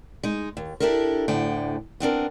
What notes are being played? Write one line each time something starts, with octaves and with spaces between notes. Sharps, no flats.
G#3 D#4
D#2
D4 E4 G4 A4 A#4
D2 A2 D3 G5
B3 C4 D4 A#4